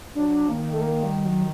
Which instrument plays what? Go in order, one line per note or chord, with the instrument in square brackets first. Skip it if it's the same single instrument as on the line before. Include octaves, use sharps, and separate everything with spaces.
[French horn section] F#3 [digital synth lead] D4
[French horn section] D#3 [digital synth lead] A#3
[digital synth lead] A3
A#3
G3
F#3